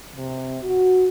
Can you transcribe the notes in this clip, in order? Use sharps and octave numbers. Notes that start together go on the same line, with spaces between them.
C3
F#4